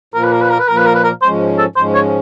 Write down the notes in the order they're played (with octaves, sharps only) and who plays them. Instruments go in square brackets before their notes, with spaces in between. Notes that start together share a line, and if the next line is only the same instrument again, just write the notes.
[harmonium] A#2 F3 A#3 [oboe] A#4
[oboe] B4
A#4
B4
A#4
B4
[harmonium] A#2 F3 A#3 [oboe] A#4
[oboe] B4
A#4
B4
A#4
[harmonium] G#2 F3 G#3 C#4 [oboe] C5
[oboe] A4
[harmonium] G#2 F3 G#3 C#4 [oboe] C5
[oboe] C#5